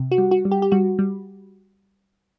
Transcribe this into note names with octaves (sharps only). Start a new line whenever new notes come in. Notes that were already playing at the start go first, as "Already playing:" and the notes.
Already playing: C3
F#4
G3
F#4
G3
G4
G4
G3 F#4
G3